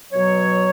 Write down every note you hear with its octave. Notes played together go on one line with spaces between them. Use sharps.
B2 F#3 C#5